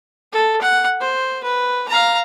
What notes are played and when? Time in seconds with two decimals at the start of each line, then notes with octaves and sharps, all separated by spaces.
0.32 A4
0.61 F#5
1.01 C5
1.43 B4
1.88 F5 A#5